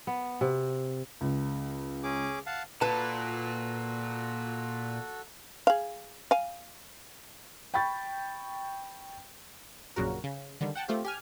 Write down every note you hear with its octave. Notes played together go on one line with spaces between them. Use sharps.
B3
C3
C#2
C#4 G#4 D6
F5 F#5 A5
A#2 F#4 A4 B4 A5
G#4 F5
F5 G#5
G5 B5 C#6 A6
A#1 F#2 A#2 C#3 F#4 A#4
C#3
D3 D#3 G3
F#5 G5 A5
A3 C4 F4 G4
G4 G#5 F6